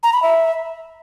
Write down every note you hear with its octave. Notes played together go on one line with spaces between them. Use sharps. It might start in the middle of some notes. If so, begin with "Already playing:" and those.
A#5
B5
E5